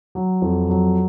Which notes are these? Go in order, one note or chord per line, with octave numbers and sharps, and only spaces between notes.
F#3
F2
F#3